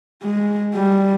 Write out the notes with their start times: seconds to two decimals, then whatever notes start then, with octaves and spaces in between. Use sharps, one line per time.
0.23 G#3
0.75 G3